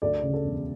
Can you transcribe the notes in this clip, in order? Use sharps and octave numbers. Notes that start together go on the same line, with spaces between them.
D2 D5
C#3
A4
E1